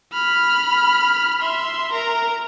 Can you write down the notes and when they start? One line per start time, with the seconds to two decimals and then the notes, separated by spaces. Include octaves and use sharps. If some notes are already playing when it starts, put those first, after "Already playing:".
0.13 B5 F6
1.42 E5 C6
1.92 A#4 A#5